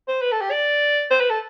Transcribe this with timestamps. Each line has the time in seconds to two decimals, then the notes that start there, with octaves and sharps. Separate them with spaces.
0.08 C5
0.22 B4
0.32 A4
0.41 G4
0.51 D5
1.11 C5
1.21 B4
1.30 A4